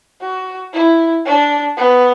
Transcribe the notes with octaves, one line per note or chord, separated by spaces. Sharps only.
F#4
E4
D4
B3